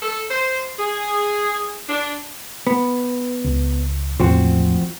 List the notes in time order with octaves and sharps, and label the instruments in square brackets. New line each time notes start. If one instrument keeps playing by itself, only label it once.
[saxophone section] A4
C5
G#4
D4
[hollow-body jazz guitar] B3
[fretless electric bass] C#2
[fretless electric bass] A#1 E2 A2 [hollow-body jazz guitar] F3 C4 F#4